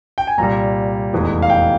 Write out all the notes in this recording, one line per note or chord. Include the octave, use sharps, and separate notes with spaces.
G5
G#5
C2 A#2 G3 A#5
F1 E2 E3 G#3
F5
G5